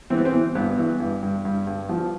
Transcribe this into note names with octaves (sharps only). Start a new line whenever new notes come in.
E3 C4
B3
C4
E3
G2 B3
E3
G2
G2
G2
G2
F3